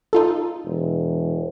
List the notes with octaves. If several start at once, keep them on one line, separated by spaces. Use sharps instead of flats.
D#4 F4 A4
E1